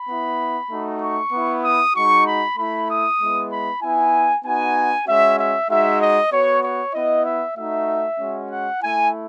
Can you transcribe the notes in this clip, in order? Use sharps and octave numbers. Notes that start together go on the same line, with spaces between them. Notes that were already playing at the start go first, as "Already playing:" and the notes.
Already playing: B5
B3 E4
A3 D#4 F#4
C#6
B3 E4
D#6
G#3 D#4 F#4 C#6
B5
A3 E4 B5
D#6
G#3 B3 E4
B5
B3 E4 G#5
B3 D#4 F#4 G#5
G#3 C#4 F#4 E5
E5
G#3 D#4 F#4 E5
D#5
B3 F#4 C#5
C#5
B3 E4 D#5
E5
A3 D#4 F#4 E5
G#3 C#4 F#4
F#5
A3 E4 G#5